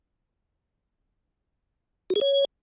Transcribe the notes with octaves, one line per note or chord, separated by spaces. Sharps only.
F#4
G#4
C#5